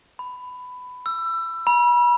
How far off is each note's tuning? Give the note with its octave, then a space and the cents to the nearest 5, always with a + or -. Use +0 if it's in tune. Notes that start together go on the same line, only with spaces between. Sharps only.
B5 +15
E6 +25
B5 -35